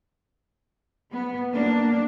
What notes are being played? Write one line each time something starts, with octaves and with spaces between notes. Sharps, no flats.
B3
A#3 D4